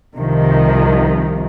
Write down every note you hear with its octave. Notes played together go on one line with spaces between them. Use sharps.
C2 C3 D#3 F3